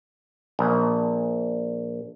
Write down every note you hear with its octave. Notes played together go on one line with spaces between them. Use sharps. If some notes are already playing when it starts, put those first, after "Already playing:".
A#1